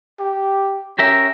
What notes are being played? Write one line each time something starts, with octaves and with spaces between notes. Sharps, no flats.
G4
C#4 G4 A#4 E5